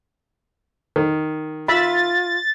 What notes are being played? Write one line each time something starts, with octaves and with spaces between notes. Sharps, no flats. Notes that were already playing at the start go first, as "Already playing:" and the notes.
D#3
F4 E5 B5 A6